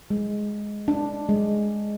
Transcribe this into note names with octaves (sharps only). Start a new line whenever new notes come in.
G#3
D4
G#3